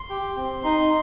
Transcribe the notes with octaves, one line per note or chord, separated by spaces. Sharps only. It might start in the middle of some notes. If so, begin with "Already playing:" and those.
Already playing: C6
G4
C4
D#4